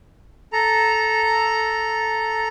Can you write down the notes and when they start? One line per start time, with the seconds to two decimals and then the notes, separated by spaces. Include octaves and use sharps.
0.52 A4 A#5